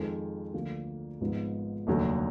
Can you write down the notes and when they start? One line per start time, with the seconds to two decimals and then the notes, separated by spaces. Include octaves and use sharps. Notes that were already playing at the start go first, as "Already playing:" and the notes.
Already playing: F2 D#3 G#3
0.54 D2 D3 F3 A#3
1.21 G#1 G#2 F3 B3
1.87 F1 D#2 D3 F#3